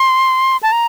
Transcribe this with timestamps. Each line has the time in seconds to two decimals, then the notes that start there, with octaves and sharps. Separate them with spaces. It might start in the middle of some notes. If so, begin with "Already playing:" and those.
Already playing: C6
0.63 A5
0.72 A#5